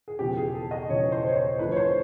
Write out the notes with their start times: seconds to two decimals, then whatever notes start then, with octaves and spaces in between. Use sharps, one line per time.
0.08 G#4
0.19 E1 E2 C#3 F3 G4
0.37 G#4
0.54 A4
0.71 D#5
0.89 E1 E2 C#3 F3 C#5
1.12 C5
1.28 C#5
1.36 C5
1.59 D2 D3 F3 B4
1.72 C#5
1.76 C5